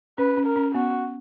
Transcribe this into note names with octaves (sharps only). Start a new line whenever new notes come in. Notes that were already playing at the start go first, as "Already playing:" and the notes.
C#4 B4
C#4
A#4
C#4
B3 F#4